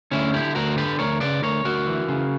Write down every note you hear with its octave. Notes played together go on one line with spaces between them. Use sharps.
D2 C#4 E4
D3 E4 G4
D2 F#4 A#4
D3 G4 B4
D2 A#4 C#5
C#3 B4 D5
D2 A#4 C#5
D2 F#4 A#4
E3
C#3